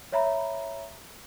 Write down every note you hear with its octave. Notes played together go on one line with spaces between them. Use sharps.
C#5 E5 A#5 B5